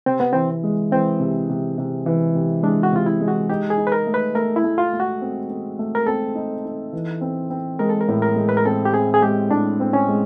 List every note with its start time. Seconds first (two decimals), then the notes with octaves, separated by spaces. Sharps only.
0.06 C3 C4
0.20 B3
0.33 E3 C4
0.64 G#3
0.91 E3 C4
1.20 C3
1.49 C3
1.78 C3
2.06 E3
2.35 C3
2.63 G#3 D4
2.83 F#4
2.92 C3 F4
3.06 E4
3.21 G#3
3.28 F#4
3.50 D#4 G4
3.70 G#4
3.77 D#4
3.87 B4
3.92 A#4
4.07 A3
4.14 B4
4.35 A3 A#4
4.56 E4
4.64 A3
4.78 F4
4.93 A3
5.00 F#4
5.22 C4
5.50 C4
5.79 A3
5.95 A#4
6.07 C4 A4
6.35 D#4
6.65 D#4
6.93 E3
7.21 C4
7.50 C4
7.79 G#3 A#4
7.89 A4
8.01 A#4
8.08 A2
8.22 A#4
8.36 G#3
8.49 B4
8.57 A#4
8.66 C4 A4
8.85 G4
8.94 C4 G#4
9.14 G#4
9.22 G#3 G4
9.51 A2 D4
9.80 C4
9.93 C#4
10.08 G#3